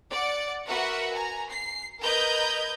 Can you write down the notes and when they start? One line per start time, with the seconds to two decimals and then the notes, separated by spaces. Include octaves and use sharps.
0.11 D5 F#5
0.67 F#4 A#4 B4 E5 F#5
1.13 G#5 A#5
1.49 C7
2.00 A#4 B4 D#5 A#5 G6 G#6